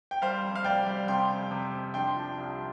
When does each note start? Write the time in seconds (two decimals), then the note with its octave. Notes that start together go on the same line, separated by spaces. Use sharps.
0.11 G5
0.22 G3 C5 F5
0.43 F2
0.55 F5
0.65 F1 D5 G5
0.87 G3
1.08 C3 G5 C6
1.30 F2
1.51 C3
1.73 F2
1.94 D4 G5 C6
2.16 F3
2.38 C2